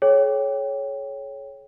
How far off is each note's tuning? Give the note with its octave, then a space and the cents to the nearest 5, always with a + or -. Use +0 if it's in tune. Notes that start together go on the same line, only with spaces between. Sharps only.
G#4 +40 C#5 +0 G5 +0